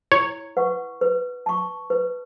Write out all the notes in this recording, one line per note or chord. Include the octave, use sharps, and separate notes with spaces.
E4 C#5
B4 F#5 C#6
B4
A5 C#6
B4